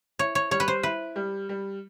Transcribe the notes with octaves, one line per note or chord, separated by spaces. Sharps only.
E4 C#5
C#5
G3 C#5
B4
C5
E4 B4
G3
G3